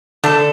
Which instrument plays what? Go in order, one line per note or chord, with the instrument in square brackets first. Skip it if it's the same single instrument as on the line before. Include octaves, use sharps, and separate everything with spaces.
[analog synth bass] D3 [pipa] A3 D4 A4